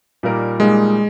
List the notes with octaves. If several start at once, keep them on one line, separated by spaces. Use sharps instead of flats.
A#2 G3 A#3 D#4 A#4
A#2 G3 G#3 A#3 D#4 A#4